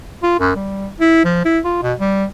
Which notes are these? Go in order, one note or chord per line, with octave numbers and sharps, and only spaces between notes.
F4
F#2
G3
E4
F3
E4
F4
B2
G3